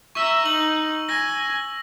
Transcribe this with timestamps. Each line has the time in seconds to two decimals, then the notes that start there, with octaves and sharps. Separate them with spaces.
0.15 E5 A#5 C#6 E6
0.46 D#4 F#7
1.09 G#5 A#6